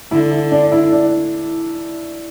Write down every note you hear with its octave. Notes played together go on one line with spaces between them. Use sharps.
D3 E4
E4
D4
E4
D4